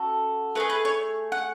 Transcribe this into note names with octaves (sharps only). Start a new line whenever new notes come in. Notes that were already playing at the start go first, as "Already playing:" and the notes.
Already playing: C#4 F#4 A4
A3 D#4 G#4 B4
B4
C#5
F#5